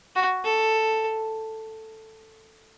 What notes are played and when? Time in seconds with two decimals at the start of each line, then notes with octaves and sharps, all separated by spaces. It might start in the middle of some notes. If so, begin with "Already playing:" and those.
0.16 F#4
0.44 A4